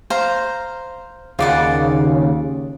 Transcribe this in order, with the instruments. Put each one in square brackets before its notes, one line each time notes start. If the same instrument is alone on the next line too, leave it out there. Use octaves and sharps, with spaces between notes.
[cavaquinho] C5 F5 A#5
[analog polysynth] D#2 C#3 [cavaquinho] F4 D5 F#5